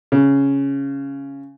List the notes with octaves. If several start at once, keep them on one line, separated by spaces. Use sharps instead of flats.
C#3